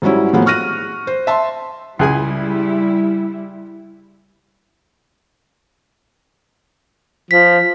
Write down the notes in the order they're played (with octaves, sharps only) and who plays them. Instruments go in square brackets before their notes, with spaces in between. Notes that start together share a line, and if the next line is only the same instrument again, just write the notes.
[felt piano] G#2 F#3 G3 C#4 E4
A2 F3 F#3 A#3 B3 G#4
C#6 F6 F#6 A#6 D#7
C5
E5 A5 C6
[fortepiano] C#2 G#4 G#5 [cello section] G3 E4
[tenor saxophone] F3 [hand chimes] B6